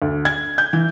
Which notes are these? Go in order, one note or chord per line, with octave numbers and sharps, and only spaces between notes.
D2
G#6
G6
E3